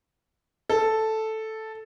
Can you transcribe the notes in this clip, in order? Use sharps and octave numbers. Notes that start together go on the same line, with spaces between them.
A4